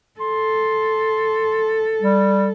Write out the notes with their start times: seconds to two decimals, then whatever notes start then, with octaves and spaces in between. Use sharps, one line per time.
0.20 A4 C6
2.02 G3